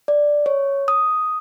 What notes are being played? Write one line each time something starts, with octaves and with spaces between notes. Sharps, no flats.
D5
C#5
D#6